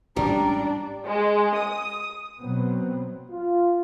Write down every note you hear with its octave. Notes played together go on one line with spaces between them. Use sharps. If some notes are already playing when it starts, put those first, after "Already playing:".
A1 G#2 G3 C#4 D4 A#5
G#3
D#6
B2 F#3 B3 C4
F4